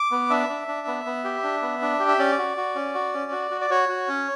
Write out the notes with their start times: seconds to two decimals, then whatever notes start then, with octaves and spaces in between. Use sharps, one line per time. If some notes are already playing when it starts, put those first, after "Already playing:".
Already playing: D6
0.11 B3
0.30 D4 E5
0.49 D4
0.68 D4
0.87 B3
1.05 B3
1.24 G4
1.43 D4
1.62 B3
1.82 D4
1.99 G4
2.08 E5
2.19 C#4 D5
2.38 F#4
2.57 F#4
2.75 C#4
2.94 F#4
3.14 C#4
3.32 F#4
3.51 F#4
3.61 D5
3.70 F#4 C#5
3.89 F#4
4.08 C#4